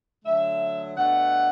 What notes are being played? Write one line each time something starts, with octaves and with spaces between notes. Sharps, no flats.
D3 F#3 A3 E5
B2 A3 D4 F#5